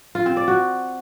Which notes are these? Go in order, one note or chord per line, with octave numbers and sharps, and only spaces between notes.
F4
C4
D5
F#4